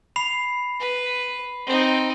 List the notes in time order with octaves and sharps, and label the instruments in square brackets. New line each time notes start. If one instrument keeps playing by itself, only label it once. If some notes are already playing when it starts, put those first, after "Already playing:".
[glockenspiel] B5 C7 F7
[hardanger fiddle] B4
C4 D#4